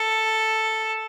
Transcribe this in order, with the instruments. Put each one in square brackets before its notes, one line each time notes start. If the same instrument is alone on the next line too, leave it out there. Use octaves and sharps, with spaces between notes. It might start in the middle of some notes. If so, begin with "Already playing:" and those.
Already playing: [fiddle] A4